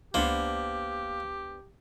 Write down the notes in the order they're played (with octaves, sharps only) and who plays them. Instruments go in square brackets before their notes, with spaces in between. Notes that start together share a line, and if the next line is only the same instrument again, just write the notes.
[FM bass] C#2 [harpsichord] A#3 [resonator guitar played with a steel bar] B3 D4 C5 [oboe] G4